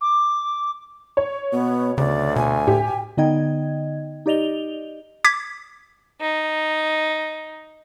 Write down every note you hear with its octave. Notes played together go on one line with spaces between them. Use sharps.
D6
C#5
B2 B3
D2 C#3 D5
B2 G#5
A2 G4
D3 B3 D#4 D#5 G5 G#6
D#4 G4 D5 D#5 F7 G7
D6 G#6 B6
D#4